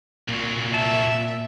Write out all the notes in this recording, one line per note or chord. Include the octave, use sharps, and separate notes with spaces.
C2 A#2 F#3
E5 A5